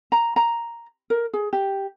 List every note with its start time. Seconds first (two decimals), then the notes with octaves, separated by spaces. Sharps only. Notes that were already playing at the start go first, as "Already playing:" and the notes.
0.12 A#5
0.36 A#5
1.10 A#4
1.33 G#4
1.53 G4